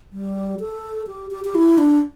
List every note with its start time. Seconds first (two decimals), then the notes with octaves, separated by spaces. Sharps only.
0.13 G3
0.60 A4
1.07 G4
1.31 G4
1.45 G4
1.55 E4
1.78 D4